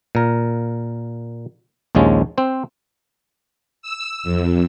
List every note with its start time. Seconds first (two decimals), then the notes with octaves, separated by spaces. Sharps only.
0.15 A#2 A#4
1.95 A#1 D#2 F3 G#3 C#4
2.38 C4 C5
3.82 E6
4.23 F2